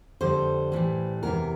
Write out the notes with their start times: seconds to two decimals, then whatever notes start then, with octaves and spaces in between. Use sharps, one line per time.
0.20 F2 D3 G3 C5
0.72 A2 E3 G3
1.23 E2 C3 E3 A#4